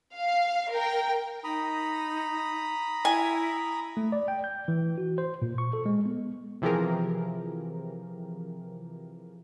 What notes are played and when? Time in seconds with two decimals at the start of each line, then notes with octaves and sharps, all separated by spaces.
0.16 F5
0.71 A#4 G5
1.44 D#4 A#5 B5 D#6
3.05 E4 G#5
3.97 A3
4.12 D5
4.28 G5
4.44 G6
4.68 E3
4.98 F#4
5.18 C5
5.42 A#2
5.58 C#6
5.73 A4
5.86 G#3
6.06 B3
6.62 C3 E3 F3 G4 G#4 A#4